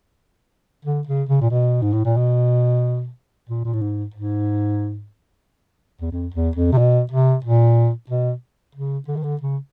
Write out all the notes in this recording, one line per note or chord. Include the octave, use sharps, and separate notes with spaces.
D3
C#3
C#3
A#2
B2
G#2
A2
A#2
B2
A#2
A#2
A2
G#2
G#2
E2
F2
E2
F2
C3
B2
C3
A#2
B2
C#3
D3
D#3
D3
C#3